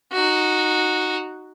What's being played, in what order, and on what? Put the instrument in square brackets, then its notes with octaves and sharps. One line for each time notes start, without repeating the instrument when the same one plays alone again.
[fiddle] D#4 F#4